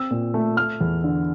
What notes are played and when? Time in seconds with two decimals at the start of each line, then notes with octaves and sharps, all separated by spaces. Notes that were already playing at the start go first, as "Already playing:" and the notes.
Already playing: C4 E6
0.11 A#2
0.34 A3
0.57 A3 F6
0.81 E2
1.04 D3